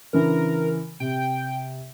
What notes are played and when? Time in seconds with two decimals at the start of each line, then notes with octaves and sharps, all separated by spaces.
0.13 C#3 E3 D4 A#4
1.00 C3 G5